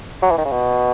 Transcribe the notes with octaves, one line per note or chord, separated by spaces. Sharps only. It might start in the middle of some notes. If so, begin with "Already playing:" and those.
F#3
E3
D#3
C#3
B2